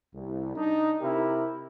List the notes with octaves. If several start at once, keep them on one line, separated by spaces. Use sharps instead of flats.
C2
D4 D#4
C3 E4 G4 A#4